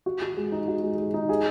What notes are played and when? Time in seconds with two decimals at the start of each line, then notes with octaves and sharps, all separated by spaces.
0.06 F#4
0.22 F#4
0.37 G#3
0.52 D#4
0.68 F#4
0.83 G#3
0.98 G#3
1.14 D#4
1.29 G#4